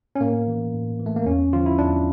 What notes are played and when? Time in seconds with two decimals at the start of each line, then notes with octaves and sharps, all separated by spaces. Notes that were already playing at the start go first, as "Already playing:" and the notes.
0.15 C#4
0.20 A2 A#3
0.47 E3
0.73 A2
0.99 E3
1.06 A3
1.17 A#3
1.26 E2 C#4
1.53 D3 F3 F4
1.66 E4
1.78 E2 D4